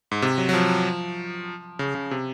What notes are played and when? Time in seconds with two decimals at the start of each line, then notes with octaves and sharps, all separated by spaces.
0.11 G#2
0.22 C3
0.38 F#3
0.49 F#3
0.54 F3
1.79 C#3
1.95 C#3
2.11 C3